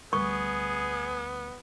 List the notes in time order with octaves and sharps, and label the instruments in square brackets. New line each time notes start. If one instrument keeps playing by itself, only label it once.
[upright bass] D2 G3 [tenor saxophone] B3 [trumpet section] G#4 [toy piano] C#6